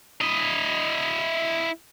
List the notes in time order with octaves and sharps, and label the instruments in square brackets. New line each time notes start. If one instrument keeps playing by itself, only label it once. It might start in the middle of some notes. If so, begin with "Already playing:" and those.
[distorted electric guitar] E4 D#5